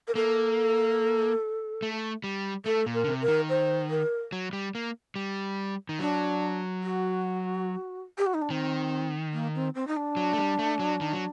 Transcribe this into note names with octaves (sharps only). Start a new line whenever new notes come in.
A#4
A#3 A4
A3
G3
A3 A4
A#2
A#4
D3
C3
A#4
D#3
C5
A#4
F#3
G3
A#3
G3
D#3
F#3 D4
F#4
G4
F#4
D#4
D4
D#3 C4
A#3
C4
C4
D#4
D4
F#3
A3
G3
A3
F#3
D#3
F#3